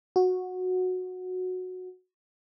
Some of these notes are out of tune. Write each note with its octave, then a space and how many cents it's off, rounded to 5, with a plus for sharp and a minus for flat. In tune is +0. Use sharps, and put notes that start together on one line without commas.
F#4 -10